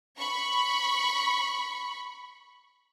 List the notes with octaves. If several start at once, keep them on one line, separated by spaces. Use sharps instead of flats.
B5 C#6